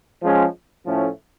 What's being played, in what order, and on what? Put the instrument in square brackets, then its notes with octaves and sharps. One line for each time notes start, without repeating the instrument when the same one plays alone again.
[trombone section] F3 G#3 C#4
A2 F3 A3 C#4